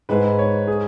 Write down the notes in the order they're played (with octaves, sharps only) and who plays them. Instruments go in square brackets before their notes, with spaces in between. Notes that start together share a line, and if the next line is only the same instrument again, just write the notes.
[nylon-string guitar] G#2 G#3 E4 [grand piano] B4
[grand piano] C#5
G#4